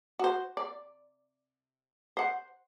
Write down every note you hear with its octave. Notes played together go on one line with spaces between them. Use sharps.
F#4 C5
D5
C5 F#5